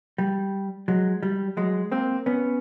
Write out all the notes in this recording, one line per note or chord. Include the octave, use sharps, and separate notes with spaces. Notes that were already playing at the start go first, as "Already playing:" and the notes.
G3
F#3 G#3
G3
F#3 G#3
A#3 C4
B3 C#4